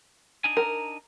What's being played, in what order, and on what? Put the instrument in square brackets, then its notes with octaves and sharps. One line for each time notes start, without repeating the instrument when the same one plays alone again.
[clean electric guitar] D4 D#4 G#5
[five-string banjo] A#4